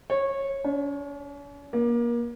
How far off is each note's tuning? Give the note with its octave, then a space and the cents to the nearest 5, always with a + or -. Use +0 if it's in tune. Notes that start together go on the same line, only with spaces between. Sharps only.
C#5 -20
C#4 +45
A#3 +30